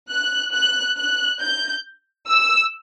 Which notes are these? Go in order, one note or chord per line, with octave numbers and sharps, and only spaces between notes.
F#6
F#6
F#6
G6
E6